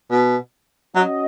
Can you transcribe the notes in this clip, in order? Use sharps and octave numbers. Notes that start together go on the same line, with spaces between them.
B2
F#3 C#4 F#4 D#5